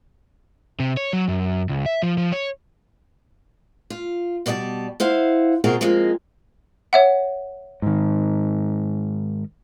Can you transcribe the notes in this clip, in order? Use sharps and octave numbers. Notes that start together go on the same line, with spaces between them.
C3
C#5
F#3
F#2
C#2
E5
F3
F3
C#5
F4
B2 G3 D5 D#5 A5
E4 C5 F5 F#5
B2 C4 F4 F#4 G#4 A#4
F3 G#3 A#3 C4
C#5 E5 F#5
G#2 D#3